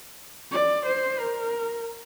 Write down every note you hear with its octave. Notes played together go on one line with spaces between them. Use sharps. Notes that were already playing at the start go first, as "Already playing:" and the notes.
D5
C5
A#4